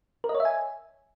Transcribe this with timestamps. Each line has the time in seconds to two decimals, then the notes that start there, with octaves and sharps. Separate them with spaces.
0.24 A#4
0.29 D#5
0.35 C#5
0.40 E5
0.45 G#5